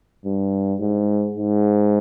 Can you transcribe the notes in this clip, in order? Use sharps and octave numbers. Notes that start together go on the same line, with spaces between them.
G2
G#2
G#2